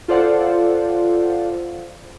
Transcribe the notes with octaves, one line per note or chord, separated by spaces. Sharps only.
F4 A4 C5 D5 F5 F#5